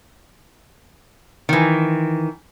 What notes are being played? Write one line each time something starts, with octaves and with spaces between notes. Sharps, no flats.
D#3 E3